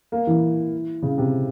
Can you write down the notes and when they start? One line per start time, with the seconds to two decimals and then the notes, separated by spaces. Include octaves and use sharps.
0.12 A#3
0.27 E3
1.03 C#3
1.18 C3